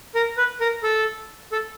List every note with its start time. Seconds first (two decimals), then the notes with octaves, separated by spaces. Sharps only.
0.15 A#4
0.37 B4
0.60 A#4
0.83 A4
1.52 A4